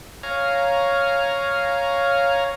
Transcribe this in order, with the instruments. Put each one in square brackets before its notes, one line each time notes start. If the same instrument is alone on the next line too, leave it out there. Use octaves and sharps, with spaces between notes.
[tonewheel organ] C#5 F5 G#5 A#5